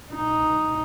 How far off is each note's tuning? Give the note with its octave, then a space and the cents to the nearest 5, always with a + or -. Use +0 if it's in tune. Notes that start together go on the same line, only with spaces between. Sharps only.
D#4 +0